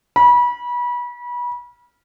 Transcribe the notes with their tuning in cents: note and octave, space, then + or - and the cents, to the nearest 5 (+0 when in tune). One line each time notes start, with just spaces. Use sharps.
B5 -30